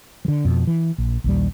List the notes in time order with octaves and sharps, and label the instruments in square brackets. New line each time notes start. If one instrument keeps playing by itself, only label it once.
[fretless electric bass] D3 F3
F2 B2
E3
A#1
A#1 D#2 G3